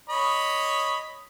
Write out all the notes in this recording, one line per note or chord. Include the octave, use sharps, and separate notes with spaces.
C#5 D#5 B5